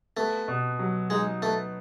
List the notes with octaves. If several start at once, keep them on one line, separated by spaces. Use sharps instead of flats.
A3 B3
B2
F#3
G#3 D#4
A3 B3